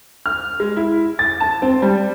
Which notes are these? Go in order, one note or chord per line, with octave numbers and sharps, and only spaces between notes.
F6
G#3
E4
A6
A5
C4
G3